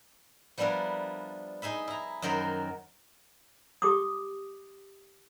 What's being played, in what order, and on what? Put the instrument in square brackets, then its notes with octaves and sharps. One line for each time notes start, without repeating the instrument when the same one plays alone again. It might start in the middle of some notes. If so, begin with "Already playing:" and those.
[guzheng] F3 G3 B3 D4 E4 A#4
D#4 G#4 E5 B5
E4 A#5
F#2 D#3 F#3 A#4 C5 B5
[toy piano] G4 D6 D#6